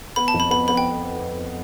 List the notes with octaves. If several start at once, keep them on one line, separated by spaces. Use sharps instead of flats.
B3 B5
A5
F2
B5
B3 B5
B3 B5
G5